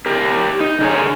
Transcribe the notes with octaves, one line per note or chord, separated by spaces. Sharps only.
G4 A#4
D#4
D3 G#4 A#4 C#5 G#5